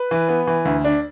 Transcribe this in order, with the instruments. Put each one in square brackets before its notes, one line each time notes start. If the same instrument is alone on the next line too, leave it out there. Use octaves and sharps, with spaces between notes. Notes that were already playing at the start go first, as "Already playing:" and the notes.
Already playing: [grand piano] B4
E3
B3
E3
D2
D4